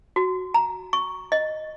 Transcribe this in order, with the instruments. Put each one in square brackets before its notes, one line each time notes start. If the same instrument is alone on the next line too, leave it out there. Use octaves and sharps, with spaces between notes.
[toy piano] F#4
A#5
C#6
D#5